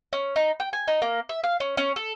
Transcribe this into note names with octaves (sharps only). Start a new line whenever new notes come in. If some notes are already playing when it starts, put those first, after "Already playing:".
C#4
D#4
G5
G#5
D#4
A#3
E5
F5
C#4
C#4
A4